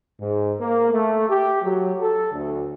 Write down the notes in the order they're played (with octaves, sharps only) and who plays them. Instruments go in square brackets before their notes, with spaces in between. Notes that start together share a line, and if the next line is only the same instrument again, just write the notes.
[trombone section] G#2
A#3
A3
G4
F#3
A4
D2